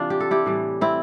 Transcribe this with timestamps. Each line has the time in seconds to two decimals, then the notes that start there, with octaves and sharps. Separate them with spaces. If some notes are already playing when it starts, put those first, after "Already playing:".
Already playing: C3 E3 G3 D4 F4
0.10 G4
0.20 A4
0.31 E4 G4
0.46 A2 E3 G3
0.81 C4 E4